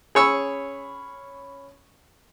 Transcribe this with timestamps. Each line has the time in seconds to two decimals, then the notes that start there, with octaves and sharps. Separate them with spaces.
0.15 C#4 G#4 C#5 B5 E6